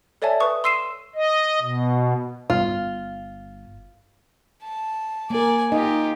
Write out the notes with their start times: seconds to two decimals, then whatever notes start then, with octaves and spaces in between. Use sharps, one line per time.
0.22 A4 C#5 D5 E5 G#5 A5
0.40 B4 G#5 C#6 D#6
0.64 C6 E6 C7 D#7 E7
1.15 D#5
1.61 B2
2.50 G1 F4
4.62 A5
5.30 A#3 A#4 D5 G#5
5.72 D#4 F4 G4 D#5